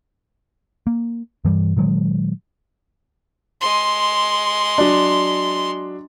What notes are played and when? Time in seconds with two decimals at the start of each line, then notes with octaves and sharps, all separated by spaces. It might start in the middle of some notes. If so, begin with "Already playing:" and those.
0.87 A#3
1.45 G2 E3 G3
1.76 A#2 D#3 F#3 G#3
3.61 G#3 C6
4.78 F#3 D4